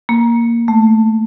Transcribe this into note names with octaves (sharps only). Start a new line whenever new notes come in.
A#3
A3